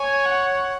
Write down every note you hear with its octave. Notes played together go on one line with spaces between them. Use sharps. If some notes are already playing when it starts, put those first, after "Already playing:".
Already playing: C#5 G#5
F#5